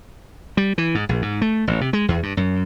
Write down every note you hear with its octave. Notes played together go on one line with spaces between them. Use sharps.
G3
E3
G#2
A#1
G#2
A3
A1
C3
G#3
E2
G2
F#2